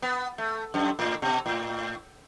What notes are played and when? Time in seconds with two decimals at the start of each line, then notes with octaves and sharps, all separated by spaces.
0.02 B3
0.38 A3
0.74 F#2
0.99 A2
1.22 B2
1.46 A2